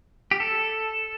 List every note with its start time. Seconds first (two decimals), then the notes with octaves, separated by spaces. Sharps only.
0.31 G4
0.40 A4